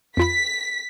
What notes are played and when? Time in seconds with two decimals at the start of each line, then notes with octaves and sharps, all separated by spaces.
0.17 F2 F4 B5 B6